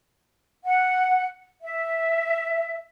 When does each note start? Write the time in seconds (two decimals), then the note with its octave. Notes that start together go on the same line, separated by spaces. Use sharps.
0.65 F#5
1.62 E5